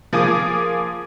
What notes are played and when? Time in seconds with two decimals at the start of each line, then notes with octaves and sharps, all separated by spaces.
0.13 F3 A#3 G#4 G#5 D6 D#6